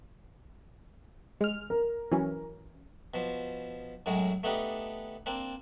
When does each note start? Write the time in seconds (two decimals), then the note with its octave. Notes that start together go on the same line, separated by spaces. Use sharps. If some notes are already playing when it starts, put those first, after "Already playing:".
1.41 G#3 F6
1.70 A#4
2.12 E3 F#3 C#4
3.14 B2 F3
4.06 F#2 A2 F#3 G#3
4.43 A3 B3 D4 D#4 G4
5.26 A#3 C4 D4